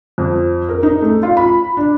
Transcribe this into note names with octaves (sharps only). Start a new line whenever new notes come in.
F2
A#4
D#4
A3
F4
B5
D4